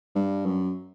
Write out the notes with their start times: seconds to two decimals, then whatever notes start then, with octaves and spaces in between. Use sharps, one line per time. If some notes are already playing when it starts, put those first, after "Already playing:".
0.15 G2
0.45 F#2